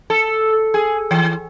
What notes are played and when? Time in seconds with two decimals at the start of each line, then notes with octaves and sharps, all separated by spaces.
0.10 A4
0.74 G#4
1.11 E3